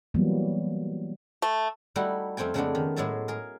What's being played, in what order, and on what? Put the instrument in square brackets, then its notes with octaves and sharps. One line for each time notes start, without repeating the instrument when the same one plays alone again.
[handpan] E3 F#3 G3 A#3 B3
[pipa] A3
[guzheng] G3 A3 D#4 E4 F#4
F2 A3 C4 G5 G#5
C#3 G#3 A3 B3 C#4 D4
D#3
A2 F#3 G#3 G#4 E5 A5
G#4 A#4